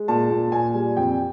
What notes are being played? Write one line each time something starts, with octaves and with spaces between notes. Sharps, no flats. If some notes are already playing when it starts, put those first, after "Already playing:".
Already playing: G#3
A#2 A5
A#2
A#2 G#5
G3
F2 G5